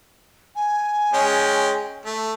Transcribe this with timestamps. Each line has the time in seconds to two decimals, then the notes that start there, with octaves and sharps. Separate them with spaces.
0.55 G#5
1.13 G#3 C#4 G5
2.05 A3